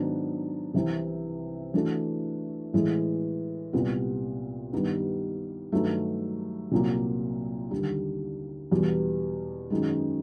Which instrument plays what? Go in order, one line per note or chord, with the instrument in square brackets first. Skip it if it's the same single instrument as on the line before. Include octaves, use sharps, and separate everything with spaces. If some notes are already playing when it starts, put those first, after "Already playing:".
Already playing: [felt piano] G#2 D#3 F#3 B3 D4
C2 C3 E3
E3 A3 D4 F#4 A4
A2 E3 G#3
C2 A#2 G3 B3
G2 D#3 G3 B3
G2 D#3 F#3 A3
C2 A#2 F#3 A#3
D#2 D3 G3
E2 B2 G3
F#2 D#3 G#3